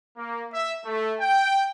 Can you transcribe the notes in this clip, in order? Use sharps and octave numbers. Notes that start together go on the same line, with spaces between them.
A#3
E5
A3
G5